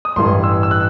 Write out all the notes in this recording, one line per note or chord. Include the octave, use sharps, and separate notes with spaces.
D#6
A1 G2 E3 C6
E6
E6
F#6